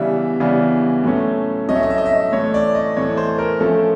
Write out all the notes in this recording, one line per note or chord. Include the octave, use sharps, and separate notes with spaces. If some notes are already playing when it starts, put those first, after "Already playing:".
Already playing: C#3 E3 G3 B3 D4 E5
C#3 E3 G3 B3 D4
A2 F#3 A3 C#4
A2 F#3 A3 C#4 D#5
E5
D#5
E5
D#5
E5
D#5
A2 E3 A3 C#5
D5
D#5
A2 E3 A3 C#5
C5
A#4
F3 A3 C#4 A4